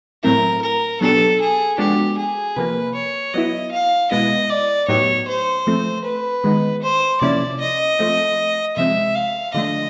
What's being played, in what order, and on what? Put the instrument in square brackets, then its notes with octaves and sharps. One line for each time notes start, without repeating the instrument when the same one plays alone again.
[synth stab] A2 F#3 A3 C4 E4 [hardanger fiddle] A#4
[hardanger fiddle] A#4
[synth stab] B2 F#3 B3 D4 G4 [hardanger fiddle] A4
[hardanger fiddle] G#4
[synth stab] F3 G#3 B3 D4 F#4 [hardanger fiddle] G4
[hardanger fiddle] G#4
[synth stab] C3 F3 A#3 [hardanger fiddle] B4
[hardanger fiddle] C#5
[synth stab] F#3 B3 E4 [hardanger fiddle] D#5
[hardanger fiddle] F5
[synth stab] B2 G#3 B3 E4 [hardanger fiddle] D#5
[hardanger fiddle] D5
[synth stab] A2 F#3 B3 D#4 G4 [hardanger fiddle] C#5
[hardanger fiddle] C5
[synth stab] F3 A3 C4
[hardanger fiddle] B4
[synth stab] D#3 G#3 B3 D#4
[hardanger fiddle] C5
[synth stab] C3 F3 A#3 C#4 E4 [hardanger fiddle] D5
[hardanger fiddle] D#5
[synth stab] F3 A3 C4
[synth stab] C3 F3 G#3 C4 [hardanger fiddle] E5
[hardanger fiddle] F5
[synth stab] D3 F3 A3 D4 [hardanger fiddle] D#5